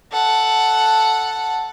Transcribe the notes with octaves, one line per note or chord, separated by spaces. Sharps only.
A4 F#5